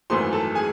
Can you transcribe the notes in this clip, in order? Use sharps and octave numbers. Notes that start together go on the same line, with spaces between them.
G#1 F#2 E3 A3 C5 C6
A4 A5
G#4 G#5